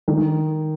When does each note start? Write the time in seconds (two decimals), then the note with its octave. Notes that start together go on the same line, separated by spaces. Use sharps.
0.08 D#3